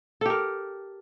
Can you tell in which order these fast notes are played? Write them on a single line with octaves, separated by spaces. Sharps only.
A4 G4 A#4